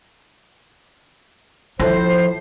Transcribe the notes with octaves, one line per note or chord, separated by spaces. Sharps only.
A2 F3 C5